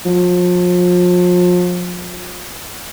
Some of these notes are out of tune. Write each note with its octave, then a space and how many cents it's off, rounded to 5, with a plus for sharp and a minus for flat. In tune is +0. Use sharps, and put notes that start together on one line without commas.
F3 +35